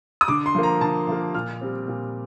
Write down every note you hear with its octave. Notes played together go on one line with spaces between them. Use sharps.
D#6
D3 D6
C6
F3 A#3
A#5
D3 A5
F3 A#3
A#2 F6
G3 C4
A#2